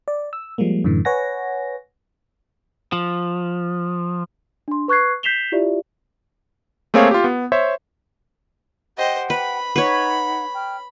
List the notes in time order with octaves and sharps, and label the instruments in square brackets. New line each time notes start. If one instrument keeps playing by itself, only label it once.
[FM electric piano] D5
E6
F3 G3 G#3 A#3
F#2 A2 D3 E3
B4 C#5 F#5 G#5 A#6
[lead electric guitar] F3
[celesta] D4 C6
B4 C#6 F#6 G#6 C7
G6 B6 C7 E7 F7 G7
E4 F4 G4 D5 E5
[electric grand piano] A3 A#3 C4 G#4 C#5 F5
F4 G4
B3
C5 C#5 E5
[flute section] G4 F#5 G5 [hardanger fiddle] C5 D#5
[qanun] B4 [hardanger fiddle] B5
[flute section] D#4 F#5 [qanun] B4 C#5
[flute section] G5 F6